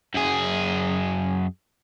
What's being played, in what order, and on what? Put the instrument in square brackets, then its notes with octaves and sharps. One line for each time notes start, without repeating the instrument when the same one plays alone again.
[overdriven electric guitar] F#2 G#4